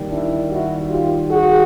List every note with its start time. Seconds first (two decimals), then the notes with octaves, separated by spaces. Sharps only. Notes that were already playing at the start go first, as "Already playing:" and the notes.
Already playing: D#2 D#3 G3
0.10 D4 E4
0.49 E4 F#4
0.89 F4 G4
1.29 F#4 G#4